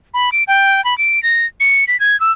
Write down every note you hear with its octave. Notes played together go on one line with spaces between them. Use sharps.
B5
D7
G5
B5
D7
A#6
C#7
B6
G#6
E6